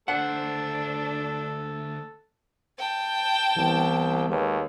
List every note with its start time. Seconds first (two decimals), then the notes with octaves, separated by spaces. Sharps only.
0.08 D2 D4 A4 C5 F#5
2.79 G5 A5
3.56 C2 E3 B3
4.29 D#2 G#3 B4 C#5